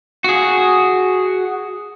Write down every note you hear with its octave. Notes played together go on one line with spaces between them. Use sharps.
F#4 G#4